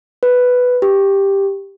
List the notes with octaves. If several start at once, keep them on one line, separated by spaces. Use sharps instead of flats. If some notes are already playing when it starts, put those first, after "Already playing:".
B4
G4